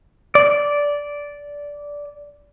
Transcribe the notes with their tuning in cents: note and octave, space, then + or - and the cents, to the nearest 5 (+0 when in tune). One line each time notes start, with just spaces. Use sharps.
D5 -10